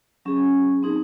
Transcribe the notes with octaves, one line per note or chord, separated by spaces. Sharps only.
F#3 C#4 G#4
C4 D#4 G#4